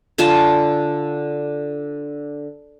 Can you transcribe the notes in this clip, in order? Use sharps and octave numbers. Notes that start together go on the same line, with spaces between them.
D3 F4 G#5 A5